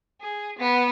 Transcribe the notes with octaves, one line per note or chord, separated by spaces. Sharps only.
G#4
B3